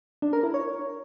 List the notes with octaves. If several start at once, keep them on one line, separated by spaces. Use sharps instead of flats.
D4
A#4
E4
C#5